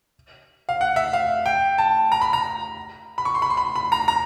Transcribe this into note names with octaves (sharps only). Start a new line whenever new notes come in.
F5
F#5
E5
F5
G5
A5
A#5
B5
A#5
B5
C#6
C6
B5
C6
B5
B5
A#5
A#5